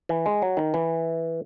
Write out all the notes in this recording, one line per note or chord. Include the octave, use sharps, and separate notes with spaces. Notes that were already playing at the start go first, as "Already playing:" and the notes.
E3
G#3
F#3
D#3
E3